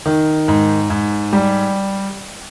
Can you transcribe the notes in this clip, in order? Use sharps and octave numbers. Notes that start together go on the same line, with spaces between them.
D#3
G#2
G#2
G3